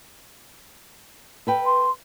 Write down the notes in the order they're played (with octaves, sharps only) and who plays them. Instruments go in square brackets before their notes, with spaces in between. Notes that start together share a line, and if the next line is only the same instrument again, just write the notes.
[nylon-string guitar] A4 B4 G5
[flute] C6